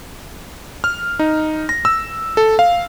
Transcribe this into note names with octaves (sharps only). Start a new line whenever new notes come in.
F6
D#4
A#6
E6
A4
F5